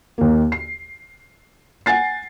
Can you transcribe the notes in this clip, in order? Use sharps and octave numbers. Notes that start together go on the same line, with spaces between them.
D#2 A#3
C7
F#5 G#5 A6 C7